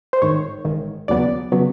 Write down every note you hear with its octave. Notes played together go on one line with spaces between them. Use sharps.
C5
A1 G#2 D#3 C#5
A1 G#2 D#3
D#2 C#3 F#3 B3 D5
C#3 F#3 B3